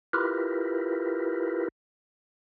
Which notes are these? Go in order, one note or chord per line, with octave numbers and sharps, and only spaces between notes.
E4 F4 G4 A#4 B4